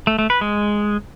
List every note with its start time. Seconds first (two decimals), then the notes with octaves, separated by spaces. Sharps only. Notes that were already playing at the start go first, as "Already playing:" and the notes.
0.07 A3
0.19 A3
0.30 B4
0.41 G#3